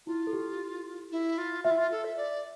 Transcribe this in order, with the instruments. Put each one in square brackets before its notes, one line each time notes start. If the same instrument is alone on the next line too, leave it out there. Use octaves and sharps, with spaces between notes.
[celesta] E4 [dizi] F4
[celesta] A4
G4
[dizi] E4
F4
[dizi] F4 [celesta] E5
[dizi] E4
F4
A4
E5
D5